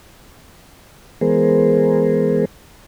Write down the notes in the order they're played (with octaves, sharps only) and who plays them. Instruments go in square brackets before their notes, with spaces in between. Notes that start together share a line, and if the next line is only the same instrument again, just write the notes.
[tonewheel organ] E3 G#3 B3 G#4 A#4 C5